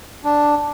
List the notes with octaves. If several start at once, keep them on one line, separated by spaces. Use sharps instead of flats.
D4